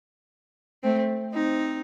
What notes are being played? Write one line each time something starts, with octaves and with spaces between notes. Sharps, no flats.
A3 C4
C4 D#4